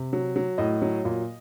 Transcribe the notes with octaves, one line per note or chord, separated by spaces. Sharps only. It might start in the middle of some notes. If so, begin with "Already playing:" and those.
Already playing: C3
F#3
F#3
A2 D#5
F#3
A#2